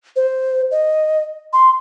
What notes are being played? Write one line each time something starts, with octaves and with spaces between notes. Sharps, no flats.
C5
D#5
C6